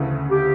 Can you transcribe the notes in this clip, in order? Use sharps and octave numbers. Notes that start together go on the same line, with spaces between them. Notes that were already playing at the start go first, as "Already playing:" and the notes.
Already playing: D2 C#3 E3 A3
G4